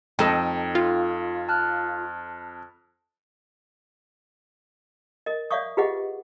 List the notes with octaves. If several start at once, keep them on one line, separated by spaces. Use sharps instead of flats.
F2 D#4 A4 G5
F4
A5 F6 F#6
A#4 D#5
C#5 D5 E5 F5 C#6 D#6
F4 G4 G#4 B4 D#5 F#5